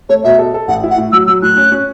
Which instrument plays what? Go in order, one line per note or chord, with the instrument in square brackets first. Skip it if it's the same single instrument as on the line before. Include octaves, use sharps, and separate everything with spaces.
[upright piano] A3 [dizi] C#5
[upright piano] B2 [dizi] E5
[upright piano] A4
A4
[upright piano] A1 [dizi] F#5
[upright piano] E4
[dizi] F#5
[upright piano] A2
[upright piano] F#3 [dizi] E6
[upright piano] F#3 [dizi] E6
[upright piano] A2 [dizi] F#6
[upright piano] C#4
C#4